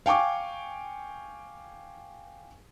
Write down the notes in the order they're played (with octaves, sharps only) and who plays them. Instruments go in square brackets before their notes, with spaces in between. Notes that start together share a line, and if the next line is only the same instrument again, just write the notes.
[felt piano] F5 G5 G#5 C#6 D6